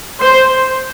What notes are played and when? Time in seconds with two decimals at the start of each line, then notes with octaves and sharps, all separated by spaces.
0.21 C5